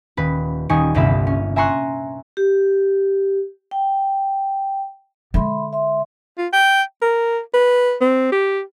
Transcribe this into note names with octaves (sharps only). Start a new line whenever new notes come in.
D#1 B4 B5
D#1 G3 D#4 G#5 C#6
G1 C2 A#3 E5 B5
C#4
E5 G#5 A#5 C6 C#6 F#6
G4
G5
D3 G#3 E5 B5 C6
E5 C6
F4
G5
A#4
B4
C4
G4